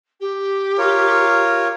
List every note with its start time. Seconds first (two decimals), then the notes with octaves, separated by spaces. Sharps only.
0.20 G4
0.78 F4 A#4 C#5